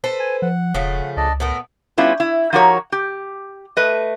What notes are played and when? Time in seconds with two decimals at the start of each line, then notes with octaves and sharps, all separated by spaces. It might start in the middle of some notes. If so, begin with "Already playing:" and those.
0.04 A4 B4 C5
0.20 G#5
0.42 F3 F#5
0.74 E1 C#3 F3 A3
1.17 C#2 D4 D5 D#5
1.40 A2 A3 B3 A#4
1.98 G3 B3 C#4 E4 F4
2.20 E4
2.53 F3 D#4 F#4 G4 A#4 C#5
2.92 G4
3.77 A3 B4 D#5